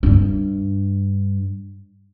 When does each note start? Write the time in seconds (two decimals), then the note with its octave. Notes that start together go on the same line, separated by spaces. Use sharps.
0.03 G2 D4